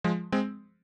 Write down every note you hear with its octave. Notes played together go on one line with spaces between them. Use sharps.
F3 G#3
G#3 C4